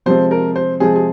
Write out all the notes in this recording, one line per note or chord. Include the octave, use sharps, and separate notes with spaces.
C3 F3 G#3 C4 C5
A#4
C5
C3 F3 G#3 C4 G#4
G#4